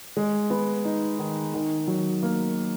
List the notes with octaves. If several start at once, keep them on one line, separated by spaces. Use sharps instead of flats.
G#3
B3
D#4
D#3
D#3
F#3
A#3